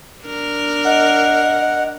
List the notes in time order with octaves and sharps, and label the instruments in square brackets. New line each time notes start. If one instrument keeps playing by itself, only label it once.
[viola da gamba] D4 A#4
[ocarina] D#5 [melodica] F#5